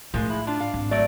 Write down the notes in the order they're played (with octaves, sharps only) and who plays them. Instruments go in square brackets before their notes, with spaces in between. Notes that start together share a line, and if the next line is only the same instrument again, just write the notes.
[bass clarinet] F#2 [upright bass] A2 [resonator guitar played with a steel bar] F3 G#3
[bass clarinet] E4
[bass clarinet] D4 [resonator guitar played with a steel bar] F4
[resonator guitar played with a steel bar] F5
[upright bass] G#1
[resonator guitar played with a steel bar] F#3 D5 [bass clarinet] A3